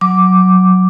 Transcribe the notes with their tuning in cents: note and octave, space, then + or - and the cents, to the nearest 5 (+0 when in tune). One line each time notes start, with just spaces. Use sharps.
F#3 +0 D6 +0